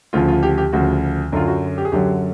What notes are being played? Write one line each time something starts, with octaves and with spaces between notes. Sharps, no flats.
D2 C#3 F3 F4
F4
G4
G4
D2 C#3 F3 F#4
F#2 D3 F#3 F4
F#4
G4
G#4
F#2 D3 F#3 G4